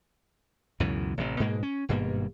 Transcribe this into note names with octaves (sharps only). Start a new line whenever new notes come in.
C#2 F#2 B2 E3
A1 C3
G#2 B2 G#3 A#3
C#4
G#1 G2 B2 A#3